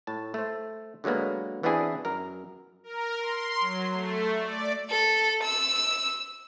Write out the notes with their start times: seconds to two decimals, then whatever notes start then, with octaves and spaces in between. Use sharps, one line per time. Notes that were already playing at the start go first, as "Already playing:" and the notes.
0.07 A2 A5
0.34 A3 C5
1.04 D3 F#3 G#3 A#3 B3
1.63 E3 B3 C4 D4 E4 G#4
2.05 F#2 A#4
2.84 A#4
3.19 C6
3.60 F#3
3.93 A3
4.39 D5
4.90 A4
5.43 E6